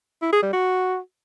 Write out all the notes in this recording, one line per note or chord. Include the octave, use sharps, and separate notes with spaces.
E4
G#4
G3
F#4